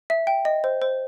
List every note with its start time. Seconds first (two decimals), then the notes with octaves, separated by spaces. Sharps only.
0.10 E5
0.27 G5
0.45 D#5
0.64 C5
0.82 C5